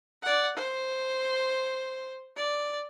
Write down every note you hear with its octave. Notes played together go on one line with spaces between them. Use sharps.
D5 F#5
C5
D5